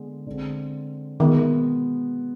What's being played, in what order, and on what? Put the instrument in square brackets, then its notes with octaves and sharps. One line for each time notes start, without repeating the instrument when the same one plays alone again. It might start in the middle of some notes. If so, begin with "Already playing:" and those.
Already playing: [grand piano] D3 G#3 B3
D3 G#3 C4
[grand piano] B2 G#3 B3 [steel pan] D#3